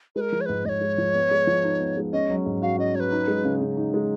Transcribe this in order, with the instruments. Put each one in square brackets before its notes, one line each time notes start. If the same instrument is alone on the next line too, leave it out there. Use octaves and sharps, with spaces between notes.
[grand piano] G#3 [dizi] A#4 B4
[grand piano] F3
[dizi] C#5
[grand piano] G#2 [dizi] B4
[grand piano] G#2 [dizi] D#5
[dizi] C#5
[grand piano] G#3
F3
B3
G#3
F3
D#4
B3
G#3
[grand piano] C#4 [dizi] D#5
[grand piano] F#3
G#2
[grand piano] F#4 [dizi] F5
[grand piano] C#4 [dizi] D#5
[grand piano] F#3 [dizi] C#5
[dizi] B4
[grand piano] D#4
G#3
C#3
C#3
D#4
G#3